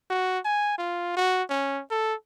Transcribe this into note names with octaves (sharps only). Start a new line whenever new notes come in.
F#4
G#5
F4
F#4
C#4
A4